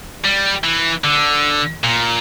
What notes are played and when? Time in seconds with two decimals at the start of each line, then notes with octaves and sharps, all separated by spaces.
0.25 G3
0.64 E3
1.04 D3
1.84 A#2